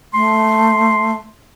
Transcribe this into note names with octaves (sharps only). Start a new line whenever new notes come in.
A3 C6